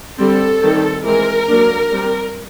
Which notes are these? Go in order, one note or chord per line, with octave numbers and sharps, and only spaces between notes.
D3 G3 C4 A4
D#3 G3 C4
E3 G#3 C4 A#4
F#3 A#3 D4
G3 C4